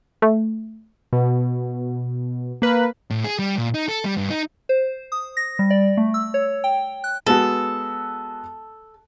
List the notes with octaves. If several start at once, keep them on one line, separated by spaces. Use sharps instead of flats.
A3
B2
A#3 B4
A2
G#4
G3
A#2
D#4
A4
G3
G2
D#4
C5
D#6
A#6
G3
D5
A3
E6
C#5
G5
F#6
G#3 B3 F#4 A4